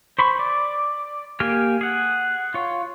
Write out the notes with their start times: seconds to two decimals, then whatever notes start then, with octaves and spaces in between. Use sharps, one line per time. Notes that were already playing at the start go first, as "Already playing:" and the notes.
0.19 C5 B5 C#6
0.39 D5
1.40 A#3 G4 G5 G#5 F6
1.81 G#4 F#5
2.54 F4 C#5